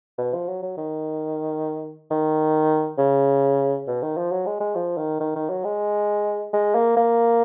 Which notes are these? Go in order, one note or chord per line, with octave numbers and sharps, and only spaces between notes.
B2
F3
F#3
F#3
D#3
D#3
C#3
B2
D#3
F3
F#3
G#3
G#3
F3
D#3
D#3
D#3
F#3
G#3
G#3
A#3
A#3